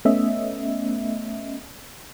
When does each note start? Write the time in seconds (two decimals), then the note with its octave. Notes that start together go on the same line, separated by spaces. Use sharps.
0.05 A3 B3 C#4 D#5 E5